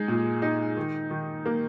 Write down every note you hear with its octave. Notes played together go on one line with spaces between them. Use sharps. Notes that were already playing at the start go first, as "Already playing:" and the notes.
Already playing: G#3 D#4
A#2
D#4
D#3
D#3
A#3